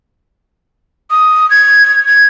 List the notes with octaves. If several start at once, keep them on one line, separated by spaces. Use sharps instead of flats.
D#6
G#6
G#6